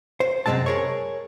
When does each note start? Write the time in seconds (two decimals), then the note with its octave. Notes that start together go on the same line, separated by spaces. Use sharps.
0.20 C5
0.46 F#2 C3 E3 G#3 C4 A5
0.66 G#4 A#4 C#5